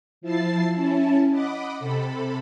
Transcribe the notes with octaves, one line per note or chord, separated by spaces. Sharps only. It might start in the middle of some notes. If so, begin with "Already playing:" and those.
F3 E4 A5 A6 C7
C#4 E4 A5
D#5 F#5 B5 D6
C3 A4 B5